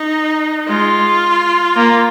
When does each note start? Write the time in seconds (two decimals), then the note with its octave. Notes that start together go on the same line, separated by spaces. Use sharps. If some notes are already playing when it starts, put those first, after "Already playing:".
Already playing: D#4
0.68 G#3 F4
1.76 A#3